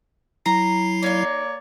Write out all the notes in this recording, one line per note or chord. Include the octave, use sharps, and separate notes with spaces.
F#3 E4 A#5 C7
A#3 D#4 C#5 D5 F5